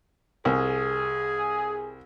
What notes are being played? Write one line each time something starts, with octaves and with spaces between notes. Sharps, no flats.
C2 G#4